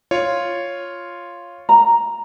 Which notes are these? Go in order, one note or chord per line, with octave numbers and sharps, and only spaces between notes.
F4 C#5
A#5